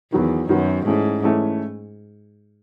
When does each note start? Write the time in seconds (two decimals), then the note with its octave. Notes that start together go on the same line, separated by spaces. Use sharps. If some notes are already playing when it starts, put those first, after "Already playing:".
0.12 E2 D#3 F#3 B3
0.49 F#2 D#3 F#3 B3
0.86 G#2 E3 A3 C#4
1.24 E3 A3 C#4